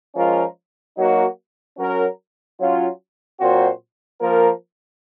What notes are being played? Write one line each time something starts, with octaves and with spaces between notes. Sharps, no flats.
F3 G#3 C#4 F4 A#4
F#3 A#3 D#4 F#4
F#3 C#4 F#4 A#4
F#3 C#4 F4
A#2 F#3 C4 F#4 C5
F3 A#3 F4 A#4